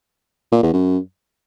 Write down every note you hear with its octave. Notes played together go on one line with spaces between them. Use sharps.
A#2
E2
F#2